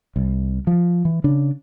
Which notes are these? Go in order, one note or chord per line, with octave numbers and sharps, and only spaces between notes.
C2
F3
E3
C#3 D4